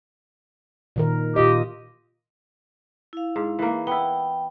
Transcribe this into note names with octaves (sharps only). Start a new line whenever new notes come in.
A#2 D#3 A#4
A#2 F4 G4 D#5
E4 F5
G#2
E3 A#3
B3 E4 G5